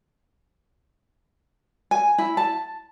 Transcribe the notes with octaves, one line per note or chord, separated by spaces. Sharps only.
G#5
E4
A5